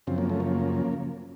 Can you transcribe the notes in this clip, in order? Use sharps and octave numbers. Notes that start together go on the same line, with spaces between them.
F#2 C#3 F3 C4
A#3
A3
A#3